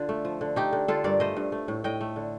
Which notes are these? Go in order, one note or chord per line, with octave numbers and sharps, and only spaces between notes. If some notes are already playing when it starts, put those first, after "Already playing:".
Already playing: D3 F4
A3
F3
D3
A3 D#4 G4
D3
D3 F4 A4
G2 A#4 D5
A3 C5 D#5
G2
A3
A2
A2 D#5 G5
A3
D3